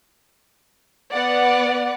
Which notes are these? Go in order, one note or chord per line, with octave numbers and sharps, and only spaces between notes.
B3 D5 F#5